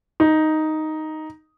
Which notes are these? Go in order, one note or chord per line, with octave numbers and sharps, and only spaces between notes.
D#4